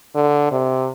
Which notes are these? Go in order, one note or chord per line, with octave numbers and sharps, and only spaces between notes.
D3
C3